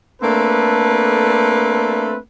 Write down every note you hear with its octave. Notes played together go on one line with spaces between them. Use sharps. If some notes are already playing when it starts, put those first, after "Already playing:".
A3 A#3 C4 D4 A4 B4